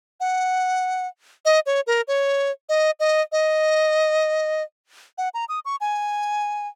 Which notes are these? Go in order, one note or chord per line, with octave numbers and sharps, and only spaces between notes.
F#5
D#5
C#5
A#4
C#5
D#5
D#5
D#5
F#5
A#5
D#6
C#6
G#5